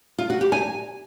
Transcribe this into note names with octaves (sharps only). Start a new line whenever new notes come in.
F4
F#4
G4
G#5